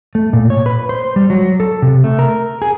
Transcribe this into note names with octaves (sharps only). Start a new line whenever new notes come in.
A3
A#2
C#5
B4
C5
G3
F#3
A4
C3
A3
A#4
G#4